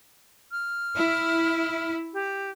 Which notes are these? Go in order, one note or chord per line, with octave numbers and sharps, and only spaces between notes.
F6
E4
G4